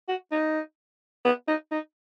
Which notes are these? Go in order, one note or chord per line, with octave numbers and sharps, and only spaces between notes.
F#4
D#4
B3
D#4
D#4